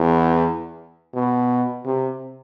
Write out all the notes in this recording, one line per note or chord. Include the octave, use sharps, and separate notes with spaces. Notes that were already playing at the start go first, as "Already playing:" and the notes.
Already playing: E2
B2
C3